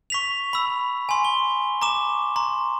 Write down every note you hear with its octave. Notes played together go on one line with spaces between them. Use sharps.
C#6 B6 F7
B5 E6
G#5 C6
G7
A#5 C#6 D6 E7
A#5 C6